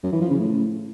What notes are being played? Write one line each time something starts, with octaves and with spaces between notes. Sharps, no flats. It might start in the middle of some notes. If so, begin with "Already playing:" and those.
F#2
E3
F3
C#3
A2